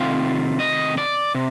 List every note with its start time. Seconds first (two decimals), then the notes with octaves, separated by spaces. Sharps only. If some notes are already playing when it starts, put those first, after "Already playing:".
Already playing: C3 D#3 A3 C4 F4 F5
0.60 D#5
0.98 D5
1.35 C3